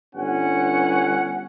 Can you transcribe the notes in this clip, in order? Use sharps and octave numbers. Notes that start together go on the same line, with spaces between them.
G1 G2 C#4 F#5